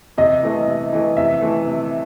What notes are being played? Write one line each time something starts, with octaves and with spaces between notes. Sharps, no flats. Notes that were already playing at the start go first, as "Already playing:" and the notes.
C3 D#5
E3 A3
C3
E3 A3
C3 E5
E3 A3
C3